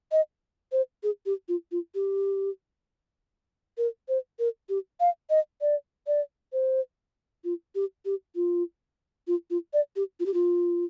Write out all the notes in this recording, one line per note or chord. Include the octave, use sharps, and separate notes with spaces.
D#5
C5
G#4
G4
F4
F4
G4
A#4
C5
A#4
G4
F5
D#5
D5
D5
C5
F4
G4
G4
F4
F4
F4
D5
G4
F4
G4
F4